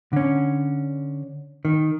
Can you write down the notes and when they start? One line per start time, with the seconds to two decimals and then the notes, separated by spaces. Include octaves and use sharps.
0.13 D3 C#4
1.65 D#3